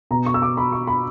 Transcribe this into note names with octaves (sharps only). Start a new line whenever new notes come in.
B2 A#5
C#6
E6
D6
B5
C#6
B5